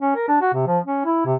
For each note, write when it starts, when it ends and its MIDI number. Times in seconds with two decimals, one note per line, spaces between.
0.01 0.14 61
0.15 0.26 70
0.28 0.37 62
0.41 0.51 66
0.54 0.66 48
0.67 0.79 53
0.86 1.02 61
1.05 1.23 64
1.25 1.35 48